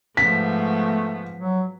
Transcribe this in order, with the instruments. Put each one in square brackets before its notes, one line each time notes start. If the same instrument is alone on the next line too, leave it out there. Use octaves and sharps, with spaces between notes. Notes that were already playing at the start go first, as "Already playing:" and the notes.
[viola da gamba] G#2 F3 B3 [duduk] A3 [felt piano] B6
[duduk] F#3